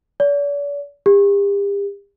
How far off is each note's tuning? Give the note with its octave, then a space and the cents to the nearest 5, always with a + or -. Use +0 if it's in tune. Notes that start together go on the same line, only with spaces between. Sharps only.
D5 -45
G4 +40